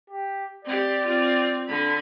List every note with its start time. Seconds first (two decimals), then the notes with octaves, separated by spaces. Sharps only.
0.10 G4
0.65 C4 G4 D5
1.05 C4 F4
1.67 D3 B5